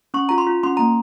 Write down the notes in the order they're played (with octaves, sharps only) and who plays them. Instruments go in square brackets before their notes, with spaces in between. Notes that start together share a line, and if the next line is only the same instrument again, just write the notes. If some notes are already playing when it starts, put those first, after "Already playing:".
[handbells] C#4 C#6
F4 A#5
C6
F4
C#4 C6
A#3 A#5